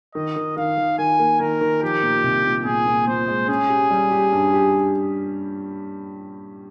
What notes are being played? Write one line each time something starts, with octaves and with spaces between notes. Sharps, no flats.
D#3 D#5
D#3
D#3 F5
D#3
D#3 G#5
A#3
D#3 A#4
D#3
F3 G4
A#2
C2
A#2
A#2 G#4
A#2
A#2 C5
G#3
C#4 G#4
G4
G3
G4
G2
G4